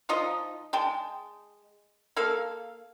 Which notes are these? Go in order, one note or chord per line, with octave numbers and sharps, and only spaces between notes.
F3 D#4 F4 D#5
G#3 G5 A5
A#3 A4 F5